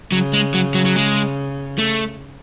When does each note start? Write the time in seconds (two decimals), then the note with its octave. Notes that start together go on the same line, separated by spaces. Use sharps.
0.12 C#3 F#3
0.33 G#3
0.54 F#3
0.75 F#3
0.85 F#3
0.96 G#3
1.78 A3